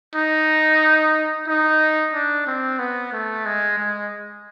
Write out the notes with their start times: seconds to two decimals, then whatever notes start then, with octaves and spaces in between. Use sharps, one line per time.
0.15 D#4
1.47 D#4
2.13 D4
2.47 C4
2.79 B3
3.12 A3
3.46 G#3
3.78 G#3